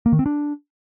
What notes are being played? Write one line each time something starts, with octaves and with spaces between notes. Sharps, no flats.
A#3
D#3
C4
D4